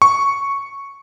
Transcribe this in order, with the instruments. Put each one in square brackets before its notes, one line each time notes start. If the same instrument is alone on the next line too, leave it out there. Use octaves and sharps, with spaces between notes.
[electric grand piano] C#6